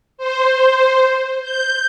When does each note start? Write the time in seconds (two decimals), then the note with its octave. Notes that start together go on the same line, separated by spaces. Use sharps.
0.17 C5
1.42 G6